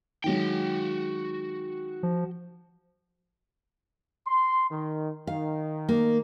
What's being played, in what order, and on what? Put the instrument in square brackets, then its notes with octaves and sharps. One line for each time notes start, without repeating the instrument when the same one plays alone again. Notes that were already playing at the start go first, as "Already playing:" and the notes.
[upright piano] D#3 F#3 G#3 [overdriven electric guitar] F#4 G5
[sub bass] F3
[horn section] C6
D#3
[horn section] D#3 [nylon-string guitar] F5
[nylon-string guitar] A#3